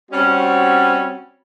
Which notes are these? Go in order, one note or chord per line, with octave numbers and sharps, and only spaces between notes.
G3 C4 C#4 F#4